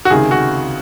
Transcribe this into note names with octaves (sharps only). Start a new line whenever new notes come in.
F#4
C#2 C3 D#3 G#4
F#4